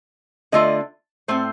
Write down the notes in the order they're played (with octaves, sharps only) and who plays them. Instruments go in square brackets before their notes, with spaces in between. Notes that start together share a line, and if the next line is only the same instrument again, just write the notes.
[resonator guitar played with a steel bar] D3 A3 D4 F4 D#5
A2 A3 C4 C5